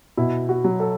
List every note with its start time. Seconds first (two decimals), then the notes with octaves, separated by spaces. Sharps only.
0.17 B2 E4
0.49 F#4
0.64 F#3
0.80 A4